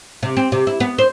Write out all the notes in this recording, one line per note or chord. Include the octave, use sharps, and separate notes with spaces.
C3
C4
C3
E4
B3
C5